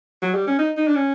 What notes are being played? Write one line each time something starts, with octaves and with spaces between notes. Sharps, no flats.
F#3
G3
C#4
D#4
D#4
D4
C#4